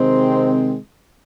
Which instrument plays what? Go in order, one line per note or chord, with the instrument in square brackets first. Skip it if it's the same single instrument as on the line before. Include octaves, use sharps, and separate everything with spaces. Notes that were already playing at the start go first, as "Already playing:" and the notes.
Already playing: [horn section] C3 D#3 G#3 C4